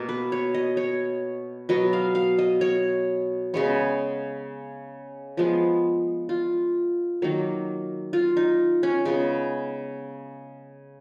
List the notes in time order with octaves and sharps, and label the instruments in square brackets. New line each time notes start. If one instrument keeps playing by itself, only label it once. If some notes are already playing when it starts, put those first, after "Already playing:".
Already playing: [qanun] B2 A#3
B4
C#5
D#5
C#5
B2 F#3 B3 D#5
F5
F5
D#5
C#5
C#3 G#3 B3 C#5
F3 G#3 B3
F4
D#3 F#3 A#3
F4
D#4
C#4
C#3 G#3 B3